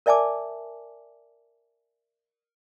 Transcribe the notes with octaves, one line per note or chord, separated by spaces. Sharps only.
A#4 D5 E5 G#5 A5 D6